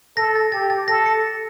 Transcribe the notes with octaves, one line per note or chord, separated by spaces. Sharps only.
A4 A#6
A6
G4 A6
A6
A4 A#6
C#7